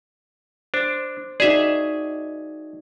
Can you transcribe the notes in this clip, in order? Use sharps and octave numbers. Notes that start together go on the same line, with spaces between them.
D4 C5
D#4 F#4 G#4 D5 E5